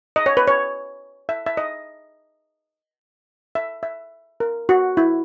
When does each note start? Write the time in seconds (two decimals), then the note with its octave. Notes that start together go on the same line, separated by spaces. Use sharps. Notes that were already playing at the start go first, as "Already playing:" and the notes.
0.16 D#5
0.26 C#5
0.37 B4
0.47 C#5
1.29 E5
1.46 E5
1.57 D#5
3.55 E5
3.83 E5
4.40 A#4
4.69 F#4
4.97 E4